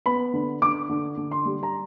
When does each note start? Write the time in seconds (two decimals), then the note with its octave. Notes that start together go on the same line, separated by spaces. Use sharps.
0.06 B3 B5
0.34 D3
0.62 D3 D6
0.89 D3
1.17 D3
1.31 C6
1.45 G3
1.63 A#5